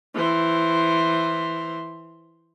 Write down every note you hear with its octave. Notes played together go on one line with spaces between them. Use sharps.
E3 C5